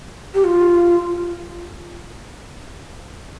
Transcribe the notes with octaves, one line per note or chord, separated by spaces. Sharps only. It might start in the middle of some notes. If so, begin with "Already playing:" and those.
G4
F4